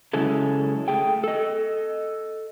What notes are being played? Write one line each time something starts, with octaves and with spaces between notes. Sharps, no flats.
C#3 F#3 G#3 C#4 E4 A4
A3 G#4 G5
A4 D#5